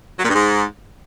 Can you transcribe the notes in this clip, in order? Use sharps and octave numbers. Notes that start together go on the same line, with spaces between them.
F#3
A#2
G2
G#2